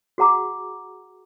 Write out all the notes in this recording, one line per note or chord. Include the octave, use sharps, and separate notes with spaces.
F#4 G#4 F#5 A#5 D6